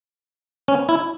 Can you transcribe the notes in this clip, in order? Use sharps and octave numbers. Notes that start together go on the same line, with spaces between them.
C#4
E4